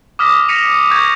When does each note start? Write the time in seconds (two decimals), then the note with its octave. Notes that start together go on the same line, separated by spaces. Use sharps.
0.19 D6 D#6 F6 A#6 B6
0.49 A#6 B6 C#7 D#7 F7
0.90 C#6 G6 G#6